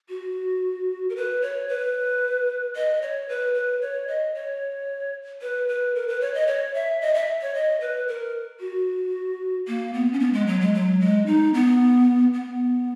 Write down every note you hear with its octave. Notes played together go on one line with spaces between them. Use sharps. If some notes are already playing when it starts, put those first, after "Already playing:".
F#4
A#4
B4
C#5
B4
D#5
C#5
B4
B4
C#5
D#5
C#5
B4
B4
A#4
B4
C#5
D#5
C#5
E5
D#5
E5
C#5
D#5
B4
A#4
F#4
A#3
B3
C#4
B3
G#3
F#3
G#3
F#3
G#3
D#4
B3
B3